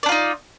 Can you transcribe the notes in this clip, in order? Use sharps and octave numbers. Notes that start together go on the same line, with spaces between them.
D4 D#4 F4 D5